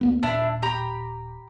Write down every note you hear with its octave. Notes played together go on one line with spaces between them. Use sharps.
D2 A#3 B3
D#1 A#2 D4 E4
G4 A#5 B5